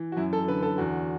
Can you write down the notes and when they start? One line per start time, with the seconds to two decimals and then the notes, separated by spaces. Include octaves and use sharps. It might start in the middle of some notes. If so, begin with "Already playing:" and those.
Already playing: E3
0.12 F#4
0.17 F#2 E4
0.33 A4
0.48 D3 B4
0.63 A4
0.78 E2 F#4